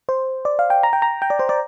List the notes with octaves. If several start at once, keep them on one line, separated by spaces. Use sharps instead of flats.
C5
D5
F5
G5
A#5
G5
A#5
G5
D5
C5
D5